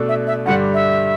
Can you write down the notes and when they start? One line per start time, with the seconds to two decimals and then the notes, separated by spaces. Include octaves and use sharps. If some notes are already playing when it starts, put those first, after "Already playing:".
Already playing: B2 A3 D4 A4
0.08 E5
0.27 E5
0.46 G2 D3 G3 D4 F#5
0.74 E5